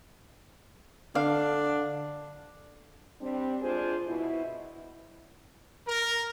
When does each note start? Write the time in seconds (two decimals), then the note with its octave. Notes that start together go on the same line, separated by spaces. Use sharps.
1.15 D3 D4 F5
3.21 G3 C4 D4
3.62 G#3 D4 F4 G#4 C5
4.07 B2 E4
5.88 A#4